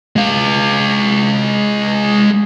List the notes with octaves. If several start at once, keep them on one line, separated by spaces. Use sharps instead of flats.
G#3 F5